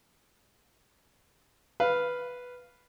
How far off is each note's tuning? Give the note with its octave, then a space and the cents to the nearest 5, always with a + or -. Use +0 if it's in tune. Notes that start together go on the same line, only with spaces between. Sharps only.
B4 +0 F5 +0